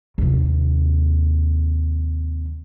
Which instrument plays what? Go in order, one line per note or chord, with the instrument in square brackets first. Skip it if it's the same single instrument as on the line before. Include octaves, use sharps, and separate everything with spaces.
[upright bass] D#2 C3